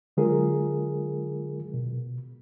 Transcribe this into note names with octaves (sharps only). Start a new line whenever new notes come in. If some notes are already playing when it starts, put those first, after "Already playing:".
D3 F#3 G#3 F4 G#4 A#4
B2